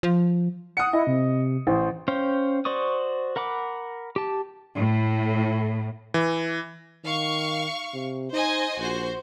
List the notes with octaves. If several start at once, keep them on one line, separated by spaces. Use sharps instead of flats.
F3
F#5 D#6 C#7
E4 D#5
C3
A1 C5
C#4 C5 F5 G5
F#4 C5 D5 C#6 D#6
A#4 F#5 B5 D6
G4 A5
A2
E3
D#3 F5 C#6
C3
D#4 C5 D#5 G#5
A#1 F#4 C5